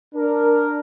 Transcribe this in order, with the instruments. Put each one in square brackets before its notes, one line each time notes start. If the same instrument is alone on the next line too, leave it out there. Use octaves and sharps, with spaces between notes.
[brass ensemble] D4 A#4